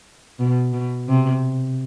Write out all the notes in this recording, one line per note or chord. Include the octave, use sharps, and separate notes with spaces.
B2
B2
C3